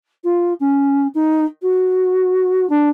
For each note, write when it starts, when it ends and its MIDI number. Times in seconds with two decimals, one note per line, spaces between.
0.24 0.54 65
0.60 1.07 61
1.15 1.45 63
1.62 2.69 66
2.70 2.89 62